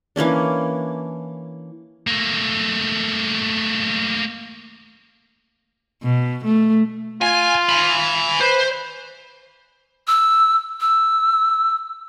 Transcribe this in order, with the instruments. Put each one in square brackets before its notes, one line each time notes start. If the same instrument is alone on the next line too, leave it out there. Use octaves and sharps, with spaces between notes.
[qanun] E3 A#3 C#4 D4
[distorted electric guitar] A3 A#3
[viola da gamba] B2
A3
[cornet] F4 [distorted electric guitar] G#5
[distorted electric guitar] G#5 B5
[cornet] B4 [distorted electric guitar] C5
[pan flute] E6
E6